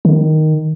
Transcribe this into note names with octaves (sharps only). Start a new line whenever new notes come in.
D#3